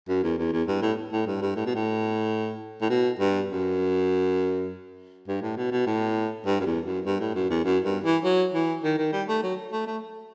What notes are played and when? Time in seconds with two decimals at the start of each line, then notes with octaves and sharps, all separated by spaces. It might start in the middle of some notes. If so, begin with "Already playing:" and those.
0.08 F#2
0.23 E2
0.38 E2
0.52 E2
0.67 G2
0.82 A2
1.12 A2
1.27 G2
1.42 G2
1.56 A2
1.66 B2
1.75 A2
2.81 A2
2.89 B2
3.19 G2
3.50 F#2
5.28 G2
5.42 A2
5.57 B2
5.72 B2
5.86 A2
6.46 G2
6.60 F#2
6.66 E2
6.86 F#2
7.05 G2
7.20 A2
7.35 F#2
7.50 E2
7.64 F#2
7.84 G2
8.04 E3
8.24 F#3
8.54 E3
8.84 D#3
8.98 D#3
9.12 G3
9.28 A3
9.43 F#3
9.72 A3
9.87 A3